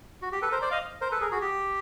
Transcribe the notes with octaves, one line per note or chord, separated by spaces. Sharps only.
F#4
G4
A4 B4
A#4 C5
C5 D5
D#5 F5
A#4 C5
A4 B4
G#4 A#4
F#4 G#4
G4